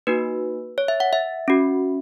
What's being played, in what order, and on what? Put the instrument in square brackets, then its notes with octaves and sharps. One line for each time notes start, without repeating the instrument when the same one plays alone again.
[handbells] A#3 D#4 F#4 B4
C#5
E5
F#5
E5
C#4 F#4